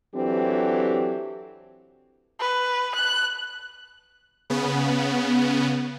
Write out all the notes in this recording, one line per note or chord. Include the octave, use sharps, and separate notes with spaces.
E3 F#3 C4 D4 G4 A4
B4
F#6
C#3 B3